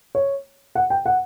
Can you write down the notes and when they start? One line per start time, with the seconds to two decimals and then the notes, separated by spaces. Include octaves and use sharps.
0.15 C#5
0.75 F#5
0.90 G5
1.06 F#5